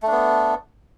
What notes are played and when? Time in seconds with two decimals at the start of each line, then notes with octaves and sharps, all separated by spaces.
0.02 A3
0.07 D4
0.12 B3